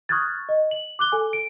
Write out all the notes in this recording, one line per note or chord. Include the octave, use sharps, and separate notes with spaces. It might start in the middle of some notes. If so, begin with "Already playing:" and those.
C#6 D#6 F6 F#6 G#6 A6
D#5
F#7
D6 F#6 G7
A4 G#5
D7